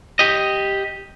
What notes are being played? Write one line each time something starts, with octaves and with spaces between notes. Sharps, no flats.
G4 D#5